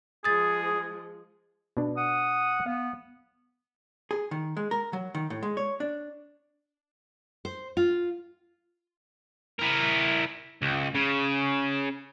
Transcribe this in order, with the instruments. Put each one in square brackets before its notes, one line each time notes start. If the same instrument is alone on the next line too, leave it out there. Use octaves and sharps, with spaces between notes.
[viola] F3 G#3 [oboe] G#4 [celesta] D#6 A6
[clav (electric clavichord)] B2 D4
[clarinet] F#5 [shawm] D#6
[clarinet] B3 [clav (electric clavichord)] F5
[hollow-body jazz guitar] G#4
D#3
G#3
A#4
F#3
D#3
A2
G#3
C#5
D4
[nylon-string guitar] C5
F4
[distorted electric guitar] E4 A#4
C#2
C#3